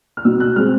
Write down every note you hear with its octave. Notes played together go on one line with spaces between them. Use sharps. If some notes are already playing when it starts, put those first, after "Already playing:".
F6
B2 E6
F#6
G#3 C4 F6